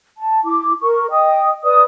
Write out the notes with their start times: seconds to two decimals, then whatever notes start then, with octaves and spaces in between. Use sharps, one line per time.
0.17 A5
0.44 E4 D6
0.81 A#4 C#6
1.11 D#5 G5 D#6
1.63 B4 D5 D#6